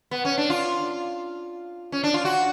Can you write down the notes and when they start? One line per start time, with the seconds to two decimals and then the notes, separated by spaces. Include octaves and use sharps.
0.11 B3
0.25 C#4
0.38 D4
0.50 F4
1.92 C#4
2.04 D4
2.14 F4
2.25 F#4